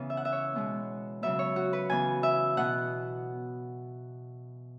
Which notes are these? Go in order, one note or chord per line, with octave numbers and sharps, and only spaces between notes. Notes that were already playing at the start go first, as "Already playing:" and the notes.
Already playing: C#3 E3 B3
E5
F#5
E5
C#5
B2 G#3 B3
C#3 F#3 B3 E5
C#5
F#4
B4
C#3 E3 B3 G#5
E5
B2 B3 F#5